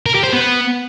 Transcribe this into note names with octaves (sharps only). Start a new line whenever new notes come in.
A#4
G4
C5
B3